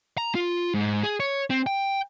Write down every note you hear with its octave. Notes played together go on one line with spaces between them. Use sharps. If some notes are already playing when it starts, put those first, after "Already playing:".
A#5
F4
G#2
G#4
C#5
C4
G5